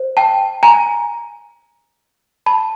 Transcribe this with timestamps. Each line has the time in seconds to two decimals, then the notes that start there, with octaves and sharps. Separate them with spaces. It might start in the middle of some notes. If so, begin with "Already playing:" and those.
Already playing: C5
0.17 G5 A5
0.63 G#5 A#5
2.46 A5 B5